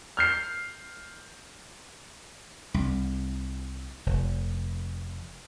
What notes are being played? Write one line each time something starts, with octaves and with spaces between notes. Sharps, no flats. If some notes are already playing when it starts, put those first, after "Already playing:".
F6 G6 C7
C2
F1